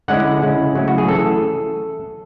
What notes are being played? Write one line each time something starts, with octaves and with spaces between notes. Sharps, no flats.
D3 G#3 C#4 E4 F#5
C#3 G#3 C#4 E4
C#3 F#3 A3 C#4 E4
F#4
G#4
E3 A3 C#4 E4 A4